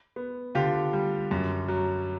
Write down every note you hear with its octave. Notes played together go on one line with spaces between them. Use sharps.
B3
D3 F4 G4
G3
F#2
F#3